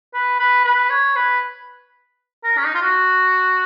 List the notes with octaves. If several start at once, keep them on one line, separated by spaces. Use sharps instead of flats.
B4
B4
B4
C#5
B4
A#4
C#4
D#4
F4
F#4